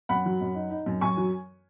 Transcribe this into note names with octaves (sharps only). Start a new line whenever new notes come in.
F#2 F#5 B5
F#3
F#2
D#4
D#4
F#2
F#2 G#5 C#6
F#3